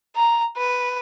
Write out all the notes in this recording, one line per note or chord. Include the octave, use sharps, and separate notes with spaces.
A#5
B4